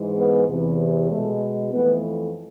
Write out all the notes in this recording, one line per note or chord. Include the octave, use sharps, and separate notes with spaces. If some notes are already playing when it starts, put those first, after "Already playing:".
Already playing: G#2 E3 G#3
B3
E2 C3 E3
B2 G#3 A3
F2 E3 A3 B3